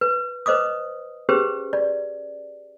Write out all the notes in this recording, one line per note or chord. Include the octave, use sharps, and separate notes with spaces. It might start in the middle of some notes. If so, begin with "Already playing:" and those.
B4
B4 C5 D#5 D6 D#6
C#4 G4 G#4 B4 C5
D5